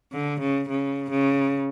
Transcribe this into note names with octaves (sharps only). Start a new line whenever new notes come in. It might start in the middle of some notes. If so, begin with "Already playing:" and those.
D3
C#3
C#3
C#3